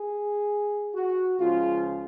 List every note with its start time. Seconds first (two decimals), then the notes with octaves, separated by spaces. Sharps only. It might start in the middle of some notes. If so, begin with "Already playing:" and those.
Already playing: G#4
0.95 F#4
1.39 C#2 C#3 F3 F4